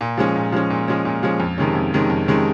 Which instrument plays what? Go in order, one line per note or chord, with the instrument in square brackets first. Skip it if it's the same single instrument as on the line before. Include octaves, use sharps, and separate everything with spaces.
[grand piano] A#2
F3 G#3 C#4
A#2
F3 G#3 C#4
A#2
F3 G#3 C#4
A#2
F3 G#3 C#4
F2
C3 D#3 G#3 C#4
F2
C3 D#3 G#3 C#4
F2
C3 D#3 G#3 C#4